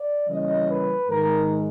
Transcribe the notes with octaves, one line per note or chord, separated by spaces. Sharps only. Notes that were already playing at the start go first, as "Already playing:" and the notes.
Already playing: D5
C#3 E3 G3 A#3 C#4 D#5
B4
G#2 D#3 G#3 A#4